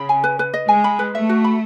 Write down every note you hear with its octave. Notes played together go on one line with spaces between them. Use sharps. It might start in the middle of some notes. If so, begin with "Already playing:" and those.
Already playing: C#3 B5
G#5
B4
B4
D#5
G#3 G#5
B5
B4
A3 E5
F#4
B5